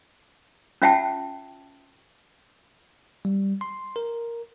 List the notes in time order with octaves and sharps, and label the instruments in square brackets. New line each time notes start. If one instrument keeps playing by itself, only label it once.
[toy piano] C#4 F4 E5 F#5 G5 A5
[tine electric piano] G3
C6
A#4